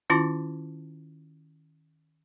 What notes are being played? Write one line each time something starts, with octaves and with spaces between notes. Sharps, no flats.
D#3 C#4 E4 F4 A5 D6